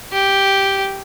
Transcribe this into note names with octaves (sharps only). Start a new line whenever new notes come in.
G4